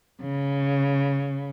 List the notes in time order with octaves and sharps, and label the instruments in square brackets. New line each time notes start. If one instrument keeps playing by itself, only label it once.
[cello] C#3